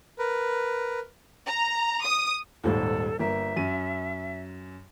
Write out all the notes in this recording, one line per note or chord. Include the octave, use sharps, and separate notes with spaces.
A#4 B4
A#5
D#6
D#1 G#1 D#2 A4
G1 A#3 A#4 E5
F#2 D#7